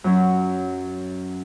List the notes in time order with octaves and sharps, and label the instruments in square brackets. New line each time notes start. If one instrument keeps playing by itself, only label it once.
[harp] F#2 F#3 C#4